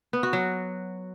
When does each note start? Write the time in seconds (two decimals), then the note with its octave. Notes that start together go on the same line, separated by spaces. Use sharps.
0.13 B3
0.23 F#4
0.33 F#3